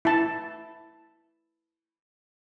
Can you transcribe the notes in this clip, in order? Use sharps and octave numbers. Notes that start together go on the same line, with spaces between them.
E4 A5